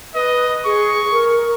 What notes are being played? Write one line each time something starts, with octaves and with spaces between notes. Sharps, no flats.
B4 D#5
G#4 C#6
A#4